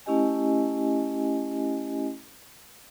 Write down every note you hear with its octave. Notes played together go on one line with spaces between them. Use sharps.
A3 C#4 E4 G4 D#5 G#5